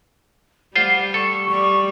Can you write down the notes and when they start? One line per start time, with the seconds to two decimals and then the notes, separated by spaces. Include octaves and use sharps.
0.76 G3 F4 C5 F#5
1.14 A4 C#6
1.49 G3 C#6